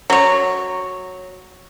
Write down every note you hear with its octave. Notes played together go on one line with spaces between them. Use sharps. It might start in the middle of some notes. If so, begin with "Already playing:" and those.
F#3 C#5